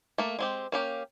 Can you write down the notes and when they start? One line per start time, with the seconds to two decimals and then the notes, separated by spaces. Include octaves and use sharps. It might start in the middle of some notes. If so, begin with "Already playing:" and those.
0.18 A3 A#3
0.39 G#3 C4 G4
0.72 A#3 C#4 G4